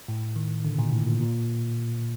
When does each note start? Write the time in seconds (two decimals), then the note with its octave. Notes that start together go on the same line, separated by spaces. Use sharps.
0.08 A2
0.36 D#3
0.65 D3
0.75 B2
0.79 A#2
0.92 A2
1.07 A#2
1.21 A#2